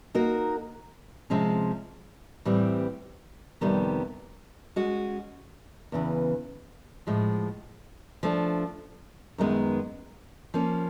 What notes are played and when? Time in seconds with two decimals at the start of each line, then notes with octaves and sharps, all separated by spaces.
0.15 A#3 D#4 F#4 A#4
1.30 C3 F3 G#3 C#4
2.45 A2 E3 G3 C4
3.61 F2 C3 D#3 G3 B3
4.76 G#3 C#4 F#4
5.92 E2 C#3 E3
7.07 A2 F3 G#3
8.23 F3 A3 D4
9.38 F#2 D#3 G#3 B3
10.54 F3 A#3 C#4